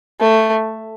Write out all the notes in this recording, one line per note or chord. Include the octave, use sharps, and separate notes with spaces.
A3